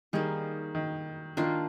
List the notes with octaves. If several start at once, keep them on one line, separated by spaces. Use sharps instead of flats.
D#3 G3 A#3 D#4 G#4
D#3
D#3 A#3 D4 F4